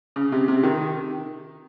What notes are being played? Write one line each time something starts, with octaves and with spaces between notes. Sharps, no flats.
C#3
C3
C3
D#3